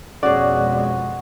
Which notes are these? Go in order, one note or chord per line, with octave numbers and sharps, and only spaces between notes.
F2 B2 G#3 C#4 F#4 G#4 D5